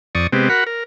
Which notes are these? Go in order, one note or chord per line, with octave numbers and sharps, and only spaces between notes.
F2 D5 C#6 D#6
C3 G#3 B3 C4 G4
F#4 A#4 F#5 B5
A#4